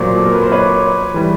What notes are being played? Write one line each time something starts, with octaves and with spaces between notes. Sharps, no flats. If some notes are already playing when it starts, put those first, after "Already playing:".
Already playing: A#2 F#3 A#3 C5 D5
A4
A#4
B4
C5
B4 C#5
E3 G3